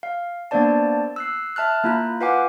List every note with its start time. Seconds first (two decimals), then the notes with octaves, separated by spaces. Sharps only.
0.03 F5
0.51 A#3 B3 D4 C5 D5 A5
1.16 E6 F#6 C7
1.56 E5 A5 F6 F#6
1.84 A#3 E4 F4 A#5 F#6
2.21 F4 B4 F5 F#5 G#5 D6